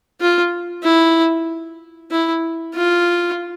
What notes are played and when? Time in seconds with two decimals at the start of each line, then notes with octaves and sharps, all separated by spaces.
0.21 F4
0.83 E4
2.11 E4
2.74 F4